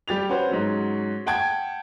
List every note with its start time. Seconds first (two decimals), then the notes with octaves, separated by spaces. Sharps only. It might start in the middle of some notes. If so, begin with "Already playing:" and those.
0.08 G3 G4 A6 F7
0.29 C#4 F#4 B4 C5
0.49 G#2 F#3 C#4
1.26 F#5 G5 A5 G#6 D7